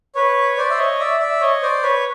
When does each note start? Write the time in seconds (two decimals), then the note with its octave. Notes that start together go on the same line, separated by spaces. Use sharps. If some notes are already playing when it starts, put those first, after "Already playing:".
0.15 B4 C#5
0.57 C5 D5
0.70 E5
0.78 C#5 D#5
0.99 D5 E5
1.20 D5 E5
1.41 C#5 D#5
1.62 C5 D5
1.82 B4 C#5